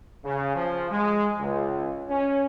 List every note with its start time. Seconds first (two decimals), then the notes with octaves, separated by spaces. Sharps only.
0.24 C#3
0.54 F3
0.90 G#3
1.38 C#2
2.08 C#4